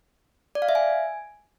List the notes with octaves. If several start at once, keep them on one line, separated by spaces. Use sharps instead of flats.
D5
F5
E5
G#5